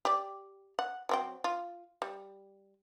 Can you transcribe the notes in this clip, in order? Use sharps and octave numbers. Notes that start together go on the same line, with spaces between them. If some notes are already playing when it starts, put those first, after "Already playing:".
G4 D5
F#5
F#3 C4 G5
F4
G3